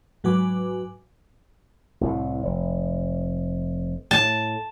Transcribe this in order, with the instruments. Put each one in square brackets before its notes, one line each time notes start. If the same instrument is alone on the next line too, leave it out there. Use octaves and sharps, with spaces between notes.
[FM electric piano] G#2 F#3 F#4 B4 G#5 D6
[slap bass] C2 A2 C3
F1
[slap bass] A2 [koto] A5